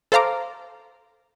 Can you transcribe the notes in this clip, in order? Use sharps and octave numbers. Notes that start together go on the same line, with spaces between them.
A4 C5 F5 A#5 D6